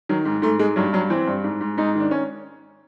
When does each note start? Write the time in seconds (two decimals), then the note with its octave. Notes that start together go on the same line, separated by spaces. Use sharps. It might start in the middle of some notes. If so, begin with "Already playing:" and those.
0.09 D#3 F#3
0.25 G#2
0.42 G#2 A3
0.59 G#2 G#3
0.76 G2 F#3
0.93 G2 F#3
1.10 E3 C4
1.27 G2
1.44 G#2
1.61 G#2
1.78 G#2 D#4
1.95 D#3 D4
2.11 C#4